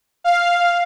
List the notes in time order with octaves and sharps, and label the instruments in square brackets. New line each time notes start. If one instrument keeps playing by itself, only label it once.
[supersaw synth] F5